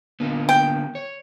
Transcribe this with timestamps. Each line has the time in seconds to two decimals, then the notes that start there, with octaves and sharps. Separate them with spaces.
0.20 D3 A#3 B3
0.49 G5
0.95 C#5